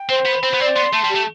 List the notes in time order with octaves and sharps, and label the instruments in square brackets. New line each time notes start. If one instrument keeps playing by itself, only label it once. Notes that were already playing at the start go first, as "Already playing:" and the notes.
Already playing: [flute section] G5
[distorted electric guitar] C4 [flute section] C5
[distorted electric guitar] B3 [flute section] B5
[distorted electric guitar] C4 [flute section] C5
[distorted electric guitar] B3
[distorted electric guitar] C4 [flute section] D5
[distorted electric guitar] B3 [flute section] C6
[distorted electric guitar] A3 [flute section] A5
[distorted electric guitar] G3
[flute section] G4
[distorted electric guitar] A3